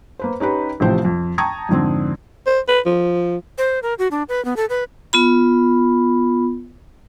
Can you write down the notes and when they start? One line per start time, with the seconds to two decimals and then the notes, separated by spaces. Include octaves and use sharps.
0.19 A#3 B4 C5
0.40 C#4 D#4 G4 B4
0.80 A1 A2 C3 F3 C5 G5
1.05 F2
1.38 G5 A5 A#5 C#6 D#6 G#6
1.69 F2 G#2 D3 C4
2.47 C5
2.68 B4
2.86 F3
3.58 C5
3.83 A#4
3.99 F#4
4.11 D4
4.29 B4
4.45 B3
4.57 A4
4.70 B4
5.13 B3 F4 B5